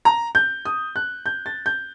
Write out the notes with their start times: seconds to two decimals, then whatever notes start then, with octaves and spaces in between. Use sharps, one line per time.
0.05 A#5
0.35 G6
0.65 D#6
0.96 F#6
1.26 G6
1.46 A6
1.66 G6